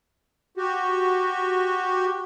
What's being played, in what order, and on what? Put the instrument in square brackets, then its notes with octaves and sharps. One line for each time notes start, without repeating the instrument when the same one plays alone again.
[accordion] F#4 G4